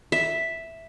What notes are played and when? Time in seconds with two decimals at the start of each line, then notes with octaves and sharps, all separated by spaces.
0.12 E5